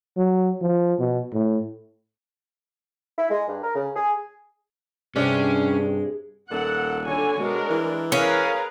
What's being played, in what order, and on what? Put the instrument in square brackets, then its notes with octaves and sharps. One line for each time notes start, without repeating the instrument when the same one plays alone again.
[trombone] F#3
F3
B2
A2
[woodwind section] E4
G#3
G2
A#4
C#3
G#4
[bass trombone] G2 [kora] C3 D4 G4 [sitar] G#3 [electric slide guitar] C#4
[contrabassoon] D#1 [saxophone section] A#2 A4 [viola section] F#5
[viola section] D3 A4 G#5 [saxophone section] F#4 C#5
[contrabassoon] B2 [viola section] G#3 D4 A#4
[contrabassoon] E3
[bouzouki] C#4 [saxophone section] G#4 F5 [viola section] A#4 B4 A#5